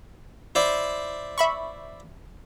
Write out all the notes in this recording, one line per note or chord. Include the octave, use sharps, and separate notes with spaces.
E4 C5 D5
E5 B5 C#6